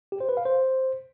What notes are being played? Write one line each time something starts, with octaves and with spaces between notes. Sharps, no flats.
G4
C5
B4
F5
C5